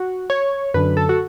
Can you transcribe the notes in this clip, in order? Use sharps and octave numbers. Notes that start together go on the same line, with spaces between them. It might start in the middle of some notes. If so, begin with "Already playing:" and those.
Already playing: F#4
C#5
F#2 D3 B4
A4
F#4